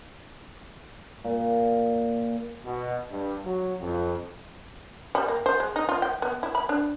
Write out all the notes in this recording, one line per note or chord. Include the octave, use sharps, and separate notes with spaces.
A#2
B2
G2
F#3
F2
G3
A#3
C5
G#3
D#4
F4
G5
B3
E4
B5
D4